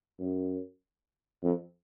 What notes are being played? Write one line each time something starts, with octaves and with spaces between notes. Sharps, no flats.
F#2
F2